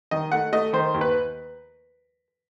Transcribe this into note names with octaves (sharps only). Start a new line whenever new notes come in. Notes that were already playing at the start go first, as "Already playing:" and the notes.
D#3 D#5
A3 F#5
A3 D#5
D#3 C5
D#2
B4